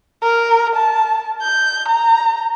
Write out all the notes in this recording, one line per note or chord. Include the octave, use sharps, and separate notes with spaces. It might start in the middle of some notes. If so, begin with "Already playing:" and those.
A#4
A5
G6
A#5